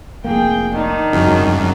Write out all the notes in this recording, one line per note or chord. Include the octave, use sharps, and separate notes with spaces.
F1 A#3 G#4 G5
D#3 D4 D#4
F#2 C#3 F#3